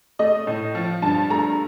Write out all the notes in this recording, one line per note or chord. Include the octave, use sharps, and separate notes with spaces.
A3 D#5
A2
F3
G2 A5
A3 A#5